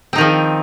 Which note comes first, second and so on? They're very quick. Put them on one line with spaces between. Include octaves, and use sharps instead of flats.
C4 D#4 D#3 F3